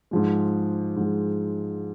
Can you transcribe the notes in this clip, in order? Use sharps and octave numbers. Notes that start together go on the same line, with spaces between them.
G#2 F3 G#3
G#2 F3 G#3